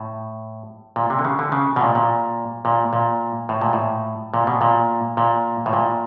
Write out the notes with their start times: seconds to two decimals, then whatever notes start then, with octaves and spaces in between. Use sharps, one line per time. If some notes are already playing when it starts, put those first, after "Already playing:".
Already playing: A2
0.96 A#2
1.10 C3
1.19 D3
1.25 C#3
1.39 D3
1.52 C#3
1.76 B2
1.81 A#2
1.95 A#2
2.65 A#2
2.93 A#2
3.49 A2
3.61 A#2
3.73 A2
4.34 A#2
4.47 B2
4.61 A#2
5.17 A#2
5.66 A2
5.73 A#2